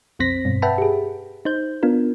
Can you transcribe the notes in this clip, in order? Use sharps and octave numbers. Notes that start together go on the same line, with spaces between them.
B1 F2 C4 C5 A#6 B6
G2 B2
B4 E5 F#5 G5 A5 B5
G4 G#4
D#4 C5 G6
B3 D4 F4 A#4